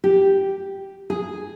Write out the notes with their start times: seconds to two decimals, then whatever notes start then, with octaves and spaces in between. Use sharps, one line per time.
0.04 G4
1.10 G#4